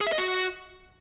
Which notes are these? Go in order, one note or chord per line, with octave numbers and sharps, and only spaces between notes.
G#4
E5
D#5
F#4